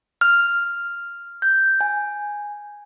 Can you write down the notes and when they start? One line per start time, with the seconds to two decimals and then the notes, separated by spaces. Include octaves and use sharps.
0.21 F6
1.42 G6
1.81 G#5